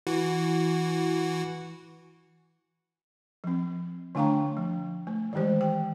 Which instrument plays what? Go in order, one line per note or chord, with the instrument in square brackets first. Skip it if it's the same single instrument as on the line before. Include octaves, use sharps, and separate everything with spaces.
[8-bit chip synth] E3 F#4
[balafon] F3 C4
D3 A3 D4 F5 G5 A#5
F3
A3
D#3 E3 G#3 G4 C5
G5